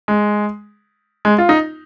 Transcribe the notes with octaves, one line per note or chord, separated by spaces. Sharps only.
G#3
G#3
F4
D#4